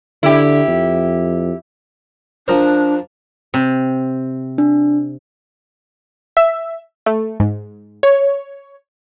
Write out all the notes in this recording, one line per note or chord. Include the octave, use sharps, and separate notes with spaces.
D3 E4 G4
F2
F3 D4 A#4 C5
C3
D4
E5
A3
G#2
C#5